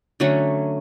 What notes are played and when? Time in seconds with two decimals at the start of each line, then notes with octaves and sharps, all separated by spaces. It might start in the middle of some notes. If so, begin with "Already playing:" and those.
0.20 D3 F#3 A3 C#4